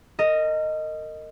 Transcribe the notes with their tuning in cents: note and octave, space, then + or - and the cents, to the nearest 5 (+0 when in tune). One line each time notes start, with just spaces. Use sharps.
A#4 -30 D#5 +0